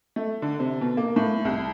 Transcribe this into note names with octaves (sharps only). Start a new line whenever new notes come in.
A3
D3
C3
B2
A#3
A2
C2